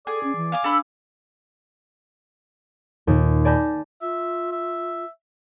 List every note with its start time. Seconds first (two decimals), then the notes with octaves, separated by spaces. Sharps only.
0.07 G#4 A4 D5
0.23 C#4
0.36 E3
0.52 F5 G#5 D6
0.64 D4 A4 B5 E6
3.07 D#2 A#2
3.45 D5 G#5 A5 B5 G6 A#6
4.01 F4 E5
4.52 E5